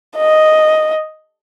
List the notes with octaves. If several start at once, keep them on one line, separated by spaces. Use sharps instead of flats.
D#5